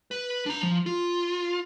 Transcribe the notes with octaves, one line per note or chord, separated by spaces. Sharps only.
B4
D4 A#5
F3
F4